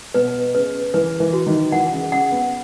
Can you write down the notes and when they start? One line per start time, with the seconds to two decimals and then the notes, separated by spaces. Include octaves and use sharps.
0.14 B2 B4
0.55 C#3 B4
0.94 E3 B4
1.20 E3
1.33 F#4
1.46 D#3
1.72 E3 F#5
1.92 C#3
2.12 C#3 F#5
2.31 B3